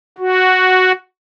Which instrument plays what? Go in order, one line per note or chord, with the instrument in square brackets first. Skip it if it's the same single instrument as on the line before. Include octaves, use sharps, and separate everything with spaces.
[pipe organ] F#4